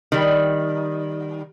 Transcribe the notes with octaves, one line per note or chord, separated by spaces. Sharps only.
D#3 G3